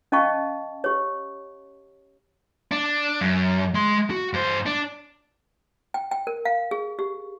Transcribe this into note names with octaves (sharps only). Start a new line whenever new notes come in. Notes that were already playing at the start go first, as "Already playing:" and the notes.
C#4 D#5 F5 G5 A5 C#6
G4 C#5
D4
F#2
G#3 C6
F#4
G2 C5
D4
G5
G5
A#4
F5
G#4
G4